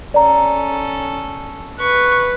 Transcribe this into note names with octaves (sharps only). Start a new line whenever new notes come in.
C#4 A4 D5 A#5
B4 C#6